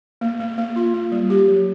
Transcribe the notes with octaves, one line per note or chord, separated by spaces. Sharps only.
A#3
A#3
A#3
F4
A#3
G3
G4
F#3